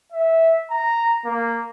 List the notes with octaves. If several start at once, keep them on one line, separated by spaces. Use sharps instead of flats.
E5
A#5
A#3